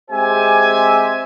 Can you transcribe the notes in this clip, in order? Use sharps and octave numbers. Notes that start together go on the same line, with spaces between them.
G#3 C4 G4 C5 E5 G#5